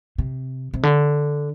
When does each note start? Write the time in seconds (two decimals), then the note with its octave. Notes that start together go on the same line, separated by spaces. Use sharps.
0.18 C3
0.74 C3
0.83 D3